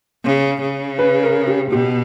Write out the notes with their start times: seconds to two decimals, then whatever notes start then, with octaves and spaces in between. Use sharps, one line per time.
0.24 C#3
0.61 C#3
0.99 B4
1.23 A#4
1.47 G4
1.72 B2 G4